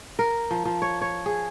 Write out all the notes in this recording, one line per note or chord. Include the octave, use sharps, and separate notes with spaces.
A#4
F3
F3
C#5
C#5
G#4